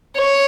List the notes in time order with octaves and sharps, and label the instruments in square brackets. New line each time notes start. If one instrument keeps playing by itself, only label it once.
[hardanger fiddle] C#5